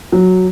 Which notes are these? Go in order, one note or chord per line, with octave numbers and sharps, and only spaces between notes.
F#3